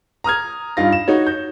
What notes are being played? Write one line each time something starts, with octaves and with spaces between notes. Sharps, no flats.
A#5 D#6 F6 G#6
G2 D#4 F4 A#6
E7
D#4 F#4 C#5
G6